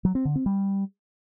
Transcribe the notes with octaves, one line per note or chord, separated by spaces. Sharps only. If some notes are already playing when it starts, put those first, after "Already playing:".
F#3
C4
D3
C4
G3